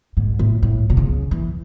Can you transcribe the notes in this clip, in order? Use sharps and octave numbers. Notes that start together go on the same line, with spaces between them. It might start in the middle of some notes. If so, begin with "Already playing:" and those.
G#2
A2
A2
B2
C#3
E3